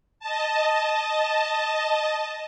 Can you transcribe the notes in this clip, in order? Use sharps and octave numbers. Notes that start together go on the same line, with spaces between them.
D#5 A5